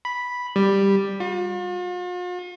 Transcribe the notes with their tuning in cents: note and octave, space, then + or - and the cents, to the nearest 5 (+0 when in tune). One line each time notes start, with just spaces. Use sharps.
B5 -5
G3 +5
F4 +45